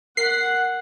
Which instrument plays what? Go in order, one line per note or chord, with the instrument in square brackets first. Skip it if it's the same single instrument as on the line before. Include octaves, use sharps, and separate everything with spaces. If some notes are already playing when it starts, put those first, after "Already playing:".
[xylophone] A#4 B6 [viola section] F#5 [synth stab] C7